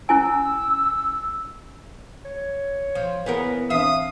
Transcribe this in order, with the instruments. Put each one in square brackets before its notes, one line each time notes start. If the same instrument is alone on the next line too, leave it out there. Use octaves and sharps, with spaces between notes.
[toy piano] C#4 E4 G#5 [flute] E6
[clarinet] C#5
[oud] F3
[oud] E3 B3 A#4 [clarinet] B4 [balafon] C#5 F#5
[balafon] E3 C4 D4 [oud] E5 [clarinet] F5 [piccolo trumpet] D#6